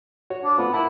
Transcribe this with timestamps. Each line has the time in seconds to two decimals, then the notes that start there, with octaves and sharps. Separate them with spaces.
0.30 F#4 C#5
0.44 D4
0.58 A3 B3 C4 F4
0.74 E4 A#4 F#5 A5